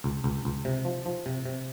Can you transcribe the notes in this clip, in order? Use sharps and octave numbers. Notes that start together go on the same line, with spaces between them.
C#2
C#2
C#2
C3
F3
F3
C3
C3